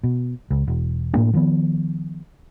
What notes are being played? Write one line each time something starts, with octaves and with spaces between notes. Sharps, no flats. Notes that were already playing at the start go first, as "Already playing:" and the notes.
B2
C#2
E1
A2 A#3 D4
D#3 F3 A#3 B3